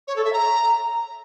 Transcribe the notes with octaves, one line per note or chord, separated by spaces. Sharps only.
C#5
A4
E5
A#5